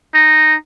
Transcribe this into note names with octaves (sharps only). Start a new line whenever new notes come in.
D#4